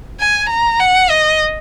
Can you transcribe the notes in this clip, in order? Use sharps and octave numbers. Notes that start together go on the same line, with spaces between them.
G#5
A#5
F#5
D#5